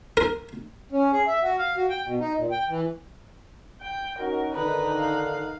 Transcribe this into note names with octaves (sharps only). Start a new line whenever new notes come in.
A#4
C#4
G#4
E5
F#4
F5
F#4
G5
B2
D#4
A#2
G5
E3
G5
C#4 D#4 F#4 A#4
D3 D#3 D#4 B4 F#6
F5